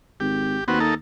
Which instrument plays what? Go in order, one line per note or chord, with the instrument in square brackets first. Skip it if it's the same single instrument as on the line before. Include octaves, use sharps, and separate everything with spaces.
[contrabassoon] G#1 [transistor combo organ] G4
[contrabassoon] D#2 [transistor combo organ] B3 C4 F#4
[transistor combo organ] A#3 D#4 A4